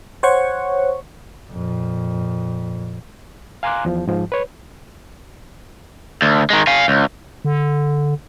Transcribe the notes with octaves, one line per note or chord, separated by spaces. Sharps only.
C5 C#5 F#5 C#6
F2 A#2
F5 G#5 A#5 C6 D6 F#6
E2 F3
G#2 F3
B4 C#5
D2
D#3 G#3
F5 G#5
C#2
D3